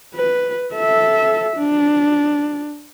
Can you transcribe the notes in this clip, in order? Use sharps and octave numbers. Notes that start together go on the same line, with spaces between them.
B4
A4 E5
D4